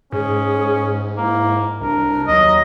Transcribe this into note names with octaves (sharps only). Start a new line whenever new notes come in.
G#2 C#4 G#4
A#3 E4
C2 D4 A#4
D#2 F#3 D#5